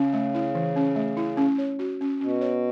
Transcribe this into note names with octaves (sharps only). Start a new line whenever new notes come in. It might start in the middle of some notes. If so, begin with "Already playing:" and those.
Already playing: C#3 C#4
A3
E4
E3
C#4
A3
E4
C#4
C#5
F#4
C#4
B2 C#4
C#5